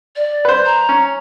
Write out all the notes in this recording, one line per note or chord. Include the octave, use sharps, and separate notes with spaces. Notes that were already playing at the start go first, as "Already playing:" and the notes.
D5
B4 C5
A#5
C#4